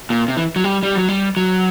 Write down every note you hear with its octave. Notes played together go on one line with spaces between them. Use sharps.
A#2
C3
E3
F#3
G3
G3
F#3
G3
F#3